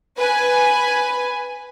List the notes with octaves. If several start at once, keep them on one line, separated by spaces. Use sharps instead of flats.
B4 G#5